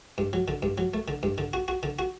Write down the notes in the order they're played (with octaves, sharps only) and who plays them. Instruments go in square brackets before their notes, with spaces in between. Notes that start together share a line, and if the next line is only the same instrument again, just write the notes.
[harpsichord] G2
F#3
D3
G2
F#3
A3
D3
G2
D3
F#4
F#4
D3
F#4